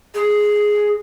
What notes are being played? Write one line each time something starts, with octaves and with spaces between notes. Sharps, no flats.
G#4